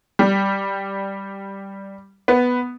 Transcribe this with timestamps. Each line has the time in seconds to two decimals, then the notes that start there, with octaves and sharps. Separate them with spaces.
0.19 G3
2.28 B3